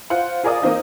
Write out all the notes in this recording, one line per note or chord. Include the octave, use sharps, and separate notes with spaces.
F4 C5 F#5
F4 G#4 A#4 D5 D#5 D#6
A#3 C4 D#4 F4